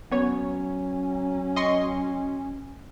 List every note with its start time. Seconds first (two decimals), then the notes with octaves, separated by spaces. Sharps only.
0.12 F#3 B3 C#4 C#5
1.56 D#5 C6 C#6